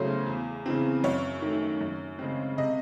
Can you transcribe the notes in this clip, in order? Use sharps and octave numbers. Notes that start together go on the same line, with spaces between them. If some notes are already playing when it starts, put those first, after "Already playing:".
Already playing: E2 C#3 F#3 A3 C#4 C5
E2
C#3 E3 C4
F#2 C#5
D#3 A3
F#2
C#3 G#3 C4
C3 D#5